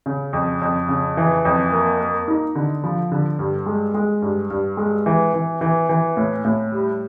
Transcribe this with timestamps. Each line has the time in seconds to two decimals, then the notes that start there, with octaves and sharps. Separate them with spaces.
0.06 C#3
0.33 F2
0.62 F2
0.89 C#3
1.17 E3
1.45 F2
1.72 A#3
2.00 A#3
2.28 D#4
2.55 D3
2.84 F3
3.12 D3
3.39 G2
3.66 G#3
3.94 G#3
4.22 G2
4.50 G2
4.77 G#3
5.06 E3
5.34 E3
5.61 E3
5.89 E3
6.17 A2
6.45 A2
6.72 G3